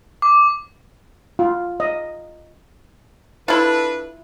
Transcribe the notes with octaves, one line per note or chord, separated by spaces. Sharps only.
D6
F4
D#5
D4 E4 F4 A4 B4